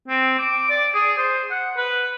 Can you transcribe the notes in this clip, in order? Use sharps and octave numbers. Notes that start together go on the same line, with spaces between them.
C4
D6
D5
G#4
C5
F#5
B4